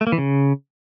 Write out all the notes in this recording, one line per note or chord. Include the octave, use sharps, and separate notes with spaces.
A3
A#3
E3
C#3